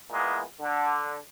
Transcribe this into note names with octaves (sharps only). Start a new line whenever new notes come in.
A#2 E3 G#3 B3
D3